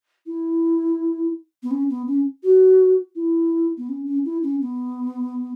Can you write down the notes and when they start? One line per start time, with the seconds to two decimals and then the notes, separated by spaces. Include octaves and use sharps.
0.26 E4
1.62 B3
1.70 C#4
1.89 B3
2.07 C#4
2.43 F#4
3.15 E4
3.77 B3
3.89 C#4
4.06 C#4
4.25 E4
4.43 C#4
4.61 B3